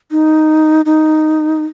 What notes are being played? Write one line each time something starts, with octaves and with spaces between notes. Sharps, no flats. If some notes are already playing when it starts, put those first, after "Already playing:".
D#4
D#4